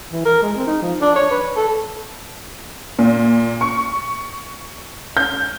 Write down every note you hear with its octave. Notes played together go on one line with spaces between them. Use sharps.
E3
A#4
G#3
C4
D#4
F3
D4
C#5
B4
A4
A#2
C#6
G6